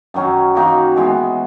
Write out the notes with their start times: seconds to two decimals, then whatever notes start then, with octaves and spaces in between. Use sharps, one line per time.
0.14 F#2 D#3 F#3 C#4
0.55 D#3 A#3 D#4 F#4
0.96 E3 G#3 B3